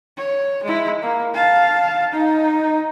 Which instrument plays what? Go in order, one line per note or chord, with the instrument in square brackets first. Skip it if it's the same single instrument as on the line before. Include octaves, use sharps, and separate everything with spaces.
[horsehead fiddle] C#5
G#3 E4
A#3
F5 A5
D#4